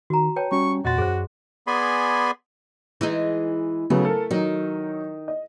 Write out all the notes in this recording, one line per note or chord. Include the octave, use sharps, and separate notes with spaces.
D#3 F#4 A#5
B4 C#5 G5 A5
G3 C#4 F#4 C#6
E2 A#2 F#4 D#5 C6 A6
F#2 G#4 C5
B3 G#4 D5 G#5 B5 C6
E3 G#3 D#4
C#3 F#3 A3 B3
A4 A#4
D#3 F#3 D#4
D#5